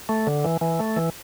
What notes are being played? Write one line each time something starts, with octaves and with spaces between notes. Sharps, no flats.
A3
D3
E3
E3
A3
E3